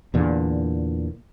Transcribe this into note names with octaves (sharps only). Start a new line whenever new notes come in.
E2 A#2 D3